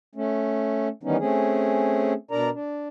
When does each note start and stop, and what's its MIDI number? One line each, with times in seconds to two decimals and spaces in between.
0.15 0.88 57
0.15 0.88 61
1.03 1.17 51
1.03 1.17 52
1.03 1.17 55
1.03 1.17 59
1.03 1.17 61
1.03 1.17 63
1.19 2.13 57
1.19 2.13 60
1.19 2.13 61
1.19 2.13 68
2.31 2.50 47
2.31 2.50 62
2.31 2.50 70
2.31 2.50 74
2.31 2.50 82
2.53 2.88 62